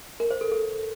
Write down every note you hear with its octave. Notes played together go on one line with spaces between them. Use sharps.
A#4
C5
A4
A4